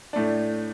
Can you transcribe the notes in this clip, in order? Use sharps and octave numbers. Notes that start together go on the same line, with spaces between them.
A2 A3 D4